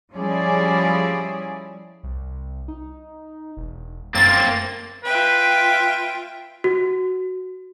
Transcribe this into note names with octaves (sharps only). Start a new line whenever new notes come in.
F3 G3 C#4 E4 G#4 D5
C2
D#4
E1
F#2 A#3 C4 A6
F4 B4 E5 G5
F#4